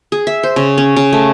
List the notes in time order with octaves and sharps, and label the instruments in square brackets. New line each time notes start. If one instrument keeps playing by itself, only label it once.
[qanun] G#4
E5
C5
C#3
C#4
C#3
A3